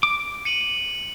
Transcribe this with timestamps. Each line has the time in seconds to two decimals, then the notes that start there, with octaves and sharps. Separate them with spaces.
0.03 D6
0.45 C#7 D#7 F#7